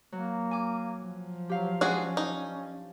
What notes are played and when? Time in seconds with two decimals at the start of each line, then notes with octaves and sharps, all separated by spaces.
0.12 F#3 A#3
0.51 G#5 D6
1.01 F3
1.49 F#3 G4 F5
1.81 G#3 C#4 D4 F#4 G#4
2.17 D#4